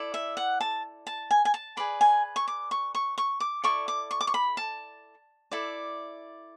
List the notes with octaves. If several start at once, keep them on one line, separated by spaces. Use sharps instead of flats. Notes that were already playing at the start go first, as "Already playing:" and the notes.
Already playing: E4 A4 D5
E5
F#5
A5
A5
G#5
G#5
A5
G#4 B4 D5 B5
G#5
C#6
D6
C#6
C#6
C#6
D6
E4 A4 D5 C#6
D6
C#6
D6
C#6
B5
A5
E4 A4 D5